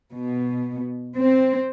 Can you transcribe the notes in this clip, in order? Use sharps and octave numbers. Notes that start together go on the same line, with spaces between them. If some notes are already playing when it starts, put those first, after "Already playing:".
B2
C4